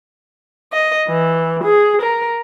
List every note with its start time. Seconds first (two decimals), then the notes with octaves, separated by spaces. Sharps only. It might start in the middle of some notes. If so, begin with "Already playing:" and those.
0.73 D#5
1.08 E3
1.63 G#4
2.01 A#4